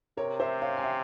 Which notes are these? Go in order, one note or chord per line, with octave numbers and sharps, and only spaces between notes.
C3 A#4 C#5
C5 E5
C#5 F5
G#5
E5 G5